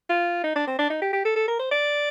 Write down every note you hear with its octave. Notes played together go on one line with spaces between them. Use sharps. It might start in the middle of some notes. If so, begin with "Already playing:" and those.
F4
D#4
D4
C4
D4
D#4
G4
G4
A4
A4
A#4
C5
D5